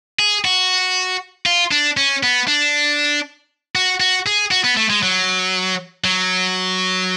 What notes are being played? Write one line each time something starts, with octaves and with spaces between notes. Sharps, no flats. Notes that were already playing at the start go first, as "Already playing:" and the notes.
G#4
F#4
F4
D4
C#4
B3
D4
F#4
F#4
G#4
F#4
B3
A3
G#3
F#3
F#3